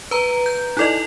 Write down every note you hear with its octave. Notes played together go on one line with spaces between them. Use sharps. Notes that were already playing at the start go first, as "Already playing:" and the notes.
B4 A#5
G6
D#4 E4 A4 D5 D#5